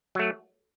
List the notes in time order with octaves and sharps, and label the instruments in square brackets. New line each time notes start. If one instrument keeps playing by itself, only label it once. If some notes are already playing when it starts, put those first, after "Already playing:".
[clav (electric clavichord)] F#3 A3